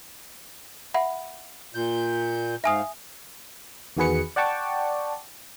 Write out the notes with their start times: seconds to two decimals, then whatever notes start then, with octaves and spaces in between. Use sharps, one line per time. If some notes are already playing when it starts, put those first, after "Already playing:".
0.94 E5 F#5 B5
1.75 A#2 G6
2.64 G#2 E5 F5 G#5 D#6
3.97 E2 D#3 F#4 G#4 B4 C#7
4.36 D5 F#5 G5 A5 C#6 D6